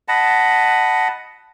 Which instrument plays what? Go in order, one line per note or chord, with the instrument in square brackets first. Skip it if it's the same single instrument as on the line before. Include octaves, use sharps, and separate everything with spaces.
[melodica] D#5 F#5 A5 B5